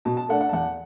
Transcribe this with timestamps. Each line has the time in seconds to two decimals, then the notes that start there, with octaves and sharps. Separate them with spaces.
0.05 B2 A5
0.17 A5
0.29 A3 D4 F#5
0.41 F#5
0.49 A5
0.52 E2 F#5